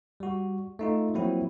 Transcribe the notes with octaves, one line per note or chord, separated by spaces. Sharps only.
G3 F#4
A3 D#4 F4
F3 F#3 A#3 C4 E4 F#4